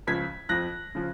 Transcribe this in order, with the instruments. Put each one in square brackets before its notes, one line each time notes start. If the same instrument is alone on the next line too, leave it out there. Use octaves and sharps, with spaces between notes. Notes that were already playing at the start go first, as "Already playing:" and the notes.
[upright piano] C#2 C#3 F3 G#6 B6
F2 F3 F#6 A#6
C#3 F3